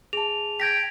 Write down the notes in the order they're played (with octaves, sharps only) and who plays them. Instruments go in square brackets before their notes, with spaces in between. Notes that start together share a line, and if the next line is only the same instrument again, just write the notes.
[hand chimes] G#4 A5 [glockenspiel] F7
[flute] G5 [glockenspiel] G#6 A#6 B6